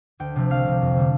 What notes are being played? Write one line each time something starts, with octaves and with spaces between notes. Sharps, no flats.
D2 G5
C3 F3 A3
C2 F5
C3 G3
F2
D3 G3